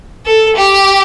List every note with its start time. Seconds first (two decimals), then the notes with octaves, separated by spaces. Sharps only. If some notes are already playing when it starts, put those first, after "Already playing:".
0.26 A4
0.57 G4